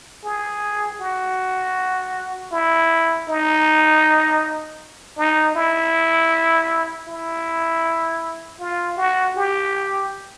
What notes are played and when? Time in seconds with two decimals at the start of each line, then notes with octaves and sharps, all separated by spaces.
0.24 G#4
1.00 F#4
2.52 E4
3.28 D#4
5.18 D#4
5.55 E4
7.08 E4
8.60 F4
8.97 F#4
9.36 G4